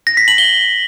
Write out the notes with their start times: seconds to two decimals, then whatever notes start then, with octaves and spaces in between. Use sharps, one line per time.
0.07 A#6
0.17 B6
0.28 F#7
0.38 G7